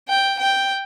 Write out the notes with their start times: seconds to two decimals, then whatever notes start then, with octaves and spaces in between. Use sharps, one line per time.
0.09 G5
0.39 G5